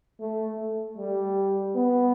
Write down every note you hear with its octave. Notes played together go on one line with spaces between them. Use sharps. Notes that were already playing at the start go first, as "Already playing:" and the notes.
A3
A3
G3
B3